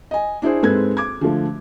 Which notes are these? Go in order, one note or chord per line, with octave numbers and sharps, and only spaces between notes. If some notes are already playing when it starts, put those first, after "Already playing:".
D#5 G#5
D4 E4 G#4 C5
G#2 G#3 C4 A4 B4 G#6
D6 G#6
D3 F3 A3